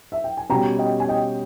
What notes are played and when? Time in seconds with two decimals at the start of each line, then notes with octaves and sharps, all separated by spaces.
0.12 E5
0.24 G5
0.37 G#5
0.49 B2 G3 C#4 G5 A#5
0.79 D#5 G5
1.00 G#5
1.08 D#5 G5